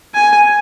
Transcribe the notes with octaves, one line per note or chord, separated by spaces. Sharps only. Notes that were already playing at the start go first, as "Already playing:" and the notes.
G#5